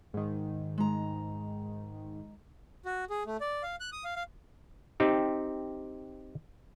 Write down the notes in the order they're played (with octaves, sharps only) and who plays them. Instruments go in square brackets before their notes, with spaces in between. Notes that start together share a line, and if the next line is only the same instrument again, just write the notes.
[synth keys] G#2 D#3
[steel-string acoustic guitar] G#3 A#5
[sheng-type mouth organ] F#4
G#4
A3
D5
F5
F#6
D#6
F5
F5
[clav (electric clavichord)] C4 D#4 G4